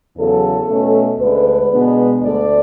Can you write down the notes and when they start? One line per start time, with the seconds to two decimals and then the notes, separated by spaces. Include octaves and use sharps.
0.17 E2 C#3 F#3 A4
0.68 B2 A3 C#4
1.19 D2 D3 G#3 B4
1.71 B2 G#3 B3 D4
2.22 D2 D3 A3 D5